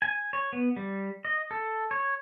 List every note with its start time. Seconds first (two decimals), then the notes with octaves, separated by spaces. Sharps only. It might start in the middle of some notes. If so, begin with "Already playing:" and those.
0.02 G#5
0.33 C#5
0.53 B3
0.76 G3
1.25 D#5
1.51 A4
1.91 C#5